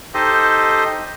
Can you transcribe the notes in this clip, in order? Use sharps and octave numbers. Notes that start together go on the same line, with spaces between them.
D#4 G4 A4 C5 D#5